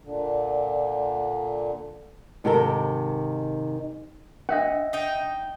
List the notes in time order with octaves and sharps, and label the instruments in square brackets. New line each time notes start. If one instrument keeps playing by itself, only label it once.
[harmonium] A#2 D3
[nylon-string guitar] G#2 C3 D#3 G4 A4 A#4
[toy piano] C#4 D4 [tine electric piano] D#5 E5 F#5
[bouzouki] D#4 G5